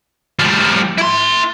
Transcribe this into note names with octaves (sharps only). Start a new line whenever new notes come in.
F3 G3
E4 C6